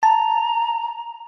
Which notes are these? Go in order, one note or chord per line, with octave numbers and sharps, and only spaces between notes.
A5 A#5